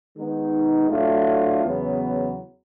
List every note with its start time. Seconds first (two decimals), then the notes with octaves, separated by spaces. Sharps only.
0.17 D#3 G#3 B3 D#4
0.90 A2 F#3 A3 D4 F4
1.64 E2 C#3 F#3 B3